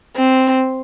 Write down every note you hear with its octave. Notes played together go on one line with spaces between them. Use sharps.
C4